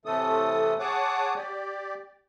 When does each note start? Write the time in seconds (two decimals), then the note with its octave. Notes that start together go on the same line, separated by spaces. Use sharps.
0.05 A2 C3 E3 A3 A4 D#6
0.79 G#4 C#5 F#5 A5 D6 D#6
1.36 G4 D5